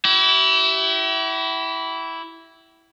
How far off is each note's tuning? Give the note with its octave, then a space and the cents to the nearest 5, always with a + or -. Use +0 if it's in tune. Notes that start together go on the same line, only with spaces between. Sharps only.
E4 +0 G4 -45